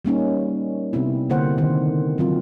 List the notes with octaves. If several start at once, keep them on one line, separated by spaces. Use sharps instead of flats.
G3 A#3 C#4 D#4
C3 B3 C4 E4
D3 A#3 C5 F#5
D#3 C4
F#3 C4 F4